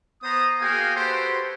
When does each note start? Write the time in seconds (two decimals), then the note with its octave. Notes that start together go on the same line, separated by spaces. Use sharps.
0.23 B3 C5 A#5 D#6
0.61 A#3 F#4 G#4 F5 G5 G#5
0.96 F#4 G4 A4 B4 C5